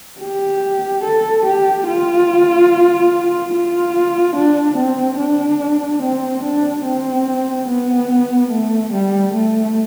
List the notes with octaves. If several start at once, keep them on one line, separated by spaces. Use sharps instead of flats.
G4
A4
G4
F4
F4
D4
C4
D4
C4
D4
C4
B3
A3
G3
A3